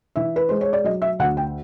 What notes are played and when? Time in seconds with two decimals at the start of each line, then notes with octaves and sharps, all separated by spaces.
0.16 E3 E5
0.36 B4
0.49 G#3 C5
0.61 C#5
0.73 D5
0.84 F#3 D#5
1.02 E5
1.19 D2 F#5
1.37 G5